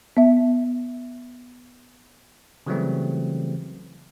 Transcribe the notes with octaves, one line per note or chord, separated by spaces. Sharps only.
B3 E5
C#3 E3 F#3 G3 A3 C4